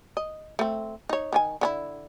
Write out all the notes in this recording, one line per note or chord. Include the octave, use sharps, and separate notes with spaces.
D#5
A3 C4
D#4 C#5
D#3 D4 G#5
D3 C#4 E4